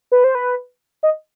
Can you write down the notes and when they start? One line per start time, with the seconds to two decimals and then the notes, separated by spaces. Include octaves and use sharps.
0.12 B4
0.24 C5
0.35 B4
1.03 D#5